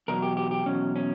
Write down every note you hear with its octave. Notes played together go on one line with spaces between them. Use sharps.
E2 B2 F#3 A#4
G4
G4
G4
E2 B2 F#3 C#4
C#4